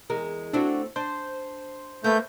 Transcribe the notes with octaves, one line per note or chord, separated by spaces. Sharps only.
E2 G#3 A#4
A3 C4 D4 E4 F#4
D4 C5
A3 A#3 B4 G6